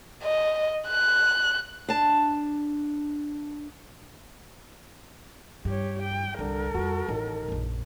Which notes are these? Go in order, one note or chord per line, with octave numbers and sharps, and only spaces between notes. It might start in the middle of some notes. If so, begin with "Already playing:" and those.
D#5
F#6
D4 A5
G2 G4 C#5
G5
C2 D3 A4 A#4
F2 G3 F#4
A1 D#3
A#1 F#2